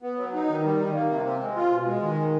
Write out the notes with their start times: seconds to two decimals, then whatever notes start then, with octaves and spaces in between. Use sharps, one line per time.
0.02 B3
0.18 F#3
0.33 D#4
0.49 D#3
0.64 G3
0.80 D#3
0.95 A#3
1.09 C3
1.25 C4
1.41 G#3
1.56 F4
1.72 B2
1.86 G#3
2.02 D#3